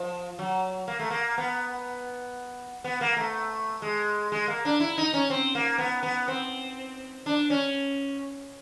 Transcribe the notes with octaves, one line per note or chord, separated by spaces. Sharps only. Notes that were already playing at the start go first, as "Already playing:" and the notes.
Already playing: F3
F#3
A#3
A3
A#3
B3
B3
A#3
A3
G#3
G#3
A#3
D4
E4
D#4
C#4
C4
A#3
B3
B3
C4
D4
C#4